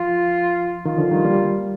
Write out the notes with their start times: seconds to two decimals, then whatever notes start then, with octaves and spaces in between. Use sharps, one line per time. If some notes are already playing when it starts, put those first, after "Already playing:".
Already playing: F3 F4
0.86 D#3 F4
0.98 D3 F3
1.11 D#3 G3
1.24 G3 A#3